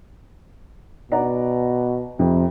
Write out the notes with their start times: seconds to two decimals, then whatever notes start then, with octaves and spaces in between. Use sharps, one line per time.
1.12 B2 D5 F#5 A#5
2.19 F2 C3